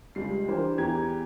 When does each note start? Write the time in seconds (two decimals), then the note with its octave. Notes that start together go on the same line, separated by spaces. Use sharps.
0.15 C#2 G3 C7
0.48 E3 D4 G4 A#4 C5
0.78 E2 E3 G4 A#5 G#6